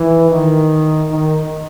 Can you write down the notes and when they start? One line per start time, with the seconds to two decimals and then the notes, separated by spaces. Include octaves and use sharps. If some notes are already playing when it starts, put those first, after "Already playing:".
Already playing: E3
0.31 D#3
1.11 D#3